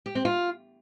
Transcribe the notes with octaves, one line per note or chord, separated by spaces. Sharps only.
G4
C4
F4